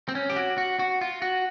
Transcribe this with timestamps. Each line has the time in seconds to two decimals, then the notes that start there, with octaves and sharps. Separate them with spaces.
0.09 C4
0.15 C#4
0.30 G4
0.36 F#4
0.58 F#4
0.79 F#4
1.01 F4
1.22 F#4